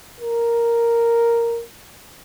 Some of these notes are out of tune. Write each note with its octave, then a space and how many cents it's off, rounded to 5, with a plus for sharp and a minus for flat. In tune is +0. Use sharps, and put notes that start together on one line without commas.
A#4 +0